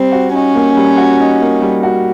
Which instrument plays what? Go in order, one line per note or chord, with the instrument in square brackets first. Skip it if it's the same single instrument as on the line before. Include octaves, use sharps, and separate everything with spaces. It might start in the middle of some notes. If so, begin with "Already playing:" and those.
Already playing: [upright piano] G3 [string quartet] C4
[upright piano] F#4
[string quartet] C#4 [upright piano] D#4
[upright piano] A#3
G3
F#4
D#4
A#3
G3
F#4